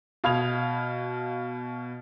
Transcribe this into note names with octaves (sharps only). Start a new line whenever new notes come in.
B2 F5 B5 D#6 G#6 F7